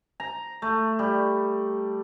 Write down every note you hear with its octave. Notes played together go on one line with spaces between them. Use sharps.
A#5
A3
G3